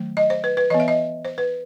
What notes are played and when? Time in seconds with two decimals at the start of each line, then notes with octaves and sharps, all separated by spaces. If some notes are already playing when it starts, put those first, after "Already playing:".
Already playing: D#3 F#3 A3
0.17 D#5
0.30 C5
0.44 B4
0.57 B4
0.70 E3 D#5
0.74 B3
0.80 E5
0.88 D#5
1.25 C5
1.38 B4